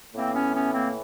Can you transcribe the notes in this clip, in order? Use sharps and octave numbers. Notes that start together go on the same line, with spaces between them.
A2 E3 A#3 C4
B3 C#4
B3 C#4
A#3 C4